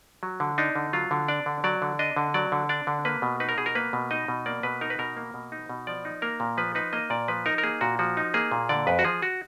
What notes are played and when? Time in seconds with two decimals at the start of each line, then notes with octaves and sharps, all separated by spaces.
0.23 F#3
0.40 D3
0.58 D4 D#4
0.76 D3
0.93 F#3 F4
1.11 D3
1.28 D4 D5
1.46 D3
1.64 F#3 D5
1.82 D3
1.99 D4 D#5
2.16 D3
2.34 F#3 D5
2.52 D3
2.69 D4 D5
2.87 D3
3.05 A#3 B4
3.22 B2
3.40 D#4 B4
3.49 A#4
3.58 B2 G#4
3.66 A#4
3.75 A#3 B4
3.93 B2
4.11 D#4 D#5
4.28 B2
4.46 A#3 D5
4.63 B2 B4
4.81 D#4 A#4
4.90 B4
4.99 B2 A#4
5.17 A#3
5.34 B2
5.52 D#4
5.69 B2
5.87 F3 D5
6.05 D#4
6.22 A#3 A#4
6.40 A#2
6.57 F3 B4
6.75 D#4 B4
6.93 A#3 D#5
7.10 A#2 D5
7.28 F3 B4
7.46 D#4 A#4
7.58 A#4
7.63 A#3 G#4
7.81 A#2 F#4
7.99 F3 F#4
8.17 D#4
8.34 A#3 G#4
8.52 A#2
8.69 D3 D5
8.87 F2 B4
8.99 F#4
9.04 F3 G#4
9.22 F#4